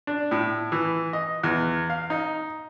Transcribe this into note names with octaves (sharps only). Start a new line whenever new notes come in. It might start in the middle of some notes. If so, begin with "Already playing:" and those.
D4
A2
E3
D#5
E2
F5
D#4